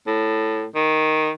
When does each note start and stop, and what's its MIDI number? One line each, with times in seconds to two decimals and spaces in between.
0.07 0.65 45
0.75 1.30 51